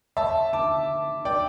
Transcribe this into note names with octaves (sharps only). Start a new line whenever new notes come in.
E5 A5
A5 D6
D5 G5